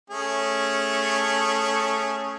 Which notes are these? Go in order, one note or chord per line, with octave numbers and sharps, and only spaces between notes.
A3 C#4 G#4